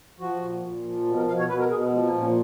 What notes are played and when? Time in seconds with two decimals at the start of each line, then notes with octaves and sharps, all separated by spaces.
0.20 F3 F#4
0.41 A#2
0.62 A#2
0.85 F3
1.06 B2
1.17 A#4
1.27 B2 F5
1.39 C#5
1.48 B2 B4
1.59 A#4
1.70 B2 G#4
1.82 B3
1.92 F3 G#3
2.06 A#3
2.14 A#2
2.20 C#4